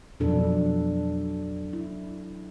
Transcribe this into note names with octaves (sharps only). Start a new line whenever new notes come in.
F2 B2 F#3 D4 A4
E4